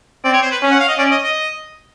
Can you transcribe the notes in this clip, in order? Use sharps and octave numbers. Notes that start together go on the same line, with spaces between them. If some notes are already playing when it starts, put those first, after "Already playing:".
C4 D5
C#5
C5
B4
C#4
F#5
F5
D#5
C#4 D5
D#5
D#5